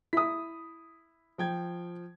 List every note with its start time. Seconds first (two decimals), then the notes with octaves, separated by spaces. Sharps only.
0.13 E4 D#6 B6
1.38 F3 G5 G#6